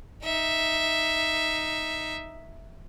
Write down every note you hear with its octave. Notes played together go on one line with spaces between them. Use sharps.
D#4 E5